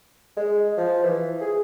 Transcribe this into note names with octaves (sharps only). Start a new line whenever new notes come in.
G#3
F3
E3
G#4